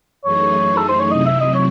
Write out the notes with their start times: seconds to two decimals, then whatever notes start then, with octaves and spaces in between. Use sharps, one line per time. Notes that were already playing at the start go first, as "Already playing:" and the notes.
0.24 F#2 E3 A3 D#4 G#4 C#5
0.77 A4
0.89 C5
0.99 C#5
1.11 C3 F#3 C4 E4 D#5
1.26 E5
1.40 D#5
1.55 C#5